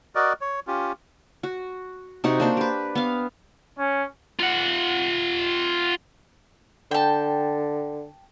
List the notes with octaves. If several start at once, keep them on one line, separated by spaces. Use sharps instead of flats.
F#4 A#4 D5 D#5
C#5
C#4 F4 G4
F#4
C3 D#4 F#4
A#3 D4 C5
G4 B4
B3 F5
C#4
F4 F#5
D3 G5 A5